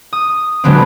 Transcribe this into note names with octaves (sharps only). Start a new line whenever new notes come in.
D#6
D3 F#3 G#3 B3 C4